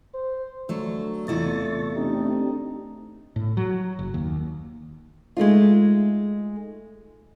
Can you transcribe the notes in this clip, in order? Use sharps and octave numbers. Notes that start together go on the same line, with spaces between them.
C5
D3 F#3 A3
E2 C3 A3 E4 F4 D#5 C#6 A6
A3 C4 D4 D#4 G4
A2
F#3
F#1
D#2
G#3 A3 D#4 F4